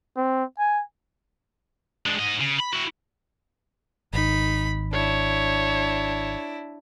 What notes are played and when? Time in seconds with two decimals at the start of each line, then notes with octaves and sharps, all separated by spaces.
0.17 C4
0.59 G#5
2.06 G#3 D4
2.19 G#2 D#5
2.41 C#3
2.60 B5
2.73 E4 F#4
4.13 G#1 D#4 B5
4.93 D4 E4 C#5